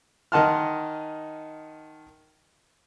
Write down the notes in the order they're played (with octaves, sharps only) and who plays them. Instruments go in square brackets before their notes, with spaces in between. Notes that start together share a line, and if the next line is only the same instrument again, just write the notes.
[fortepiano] D#3 D#5 F#5 A5 C6 F6